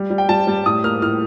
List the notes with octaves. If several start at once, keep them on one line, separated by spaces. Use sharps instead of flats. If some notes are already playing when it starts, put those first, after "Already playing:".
Already playing: G3
G3
G5
G3 A5
G3
A2 D#6
A#3 F6
A2 F6